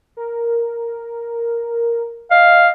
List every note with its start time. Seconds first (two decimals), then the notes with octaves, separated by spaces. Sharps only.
0.17 A#4
2.31 D#5 F5